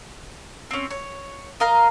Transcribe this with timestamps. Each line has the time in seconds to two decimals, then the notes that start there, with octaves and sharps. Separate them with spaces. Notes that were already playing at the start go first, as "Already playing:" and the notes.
0.71 C4 C#4
0.90 C#5
1.60 A#4 D#5 F5 A#5